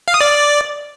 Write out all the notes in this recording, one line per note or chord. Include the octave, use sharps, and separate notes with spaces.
F5
D#6
D5